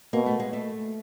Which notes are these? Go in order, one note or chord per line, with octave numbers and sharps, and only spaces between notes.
B2 A#3
A3
G#3
A3